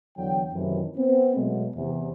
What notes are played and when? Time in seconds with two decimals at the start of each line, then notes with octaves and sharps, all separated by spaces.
0.18 E2 D3 F#3 G5
0.52 F#2 A2 C3 D#3 E3 F#3
0.97 B3 C4
1.35 B2 F#3 G#3 A3 B3
1.75 E2 C3